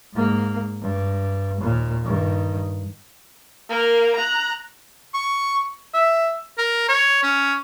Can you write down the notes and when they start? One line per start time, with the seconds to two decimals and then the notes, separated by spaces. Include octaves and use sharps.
0.14 G#2 A#3
0.81 G2
1.61 D#2 A#2
2.04 G2 D#3
3.69 A#3 A#4
4.16 A#5 F#6
5.14 C#6
5.94 E5
6.58 A#4
6.89 C#5
7.23 C#4